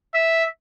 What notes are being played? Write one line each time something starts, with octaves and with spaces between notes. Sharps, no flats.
E5